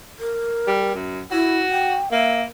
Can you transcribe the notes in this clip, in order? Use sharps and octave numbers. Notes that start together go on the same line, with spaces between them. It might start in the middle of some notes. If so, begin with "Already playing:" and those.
A#4
G3
F#2
E4 F#4
G5
A#3 E5